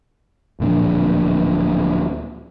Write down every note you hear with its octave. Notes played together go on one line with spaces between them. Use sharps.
D1 A#2 F3 D4